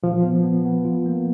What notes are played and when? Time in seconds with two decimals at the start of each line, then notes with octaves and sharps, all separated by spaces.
0.03 A#2 F3
0.23 B3
0.44 B3
0.65 B3
0.85 F4
1.06 A#3